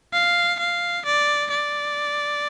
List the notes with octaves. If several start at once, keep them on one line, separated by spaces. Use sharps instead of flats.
F5
F5
D5
D5